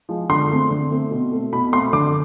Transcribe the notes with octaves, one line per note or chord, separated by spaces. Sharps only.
F3 G#3
D3 C6
A3 C4
D3
A3 C4
B2
A3 C4
B2 B5
A3 C4 C6
D3 D6